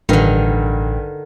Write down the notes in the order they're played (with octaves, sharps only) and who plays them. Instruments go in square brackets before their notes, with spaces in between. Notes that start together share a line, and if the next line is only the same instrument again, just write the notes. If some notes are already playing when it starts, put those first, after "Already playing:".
[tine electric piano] A1 [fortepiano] G2 [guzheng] D3 D#3